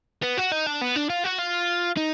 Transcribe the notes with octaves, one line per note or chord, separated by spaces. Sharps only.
B3
F#4
D#4
D4
B3
D4
F4
F#4
F4
D#4